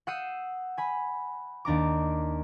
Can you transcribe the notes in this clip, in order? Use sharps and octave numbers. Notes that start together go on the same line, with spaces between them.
F#5 D#6 E6 G6 C7 D#7
G#5 B5
D#2 D4 A#5 D6